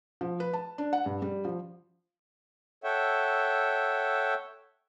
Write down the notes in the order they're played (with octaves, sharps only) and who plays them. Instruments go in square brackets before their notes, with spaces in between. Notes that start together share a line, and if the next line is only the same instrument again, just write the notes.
[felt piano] F3
B4
A5
D4
F#5
G2
G3
F3
[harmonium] A4 C#5 E5 F#5 G5